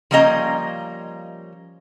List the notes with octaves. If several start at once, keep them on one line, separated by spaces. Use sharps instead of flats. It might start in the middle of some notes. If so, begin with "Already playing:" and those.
F3 G3 A#3 C#4 D#5 A#5